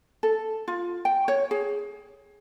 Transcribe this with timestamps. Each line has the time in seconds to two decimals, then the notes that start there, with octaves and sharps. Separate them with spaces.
0.23 A4
0.68 F4
1.05 G5
1.28 C#5
1.51 G#4